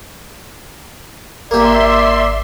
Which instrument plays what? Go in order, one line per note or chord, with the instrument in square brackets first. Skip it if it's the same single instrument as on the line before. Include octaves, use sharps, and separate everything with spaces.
[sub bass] G#1 [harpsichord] A#3 G4 [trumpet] D5 [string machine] E5 C6